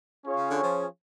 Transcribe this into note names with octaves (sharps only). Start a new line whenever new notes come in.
C#4 F4 G#4 C#5 F5
C#3
D3
F3